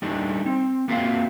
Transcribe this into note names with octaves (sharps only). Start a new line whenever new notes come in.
G3 A3 D4 D#4
C4
A#3 C4 F4 F#4 E5 F5